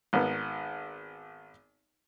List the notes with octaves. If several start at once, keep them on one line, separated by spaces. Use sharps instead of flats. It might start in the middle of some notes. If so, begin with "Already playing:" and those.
G#1 B3 A#4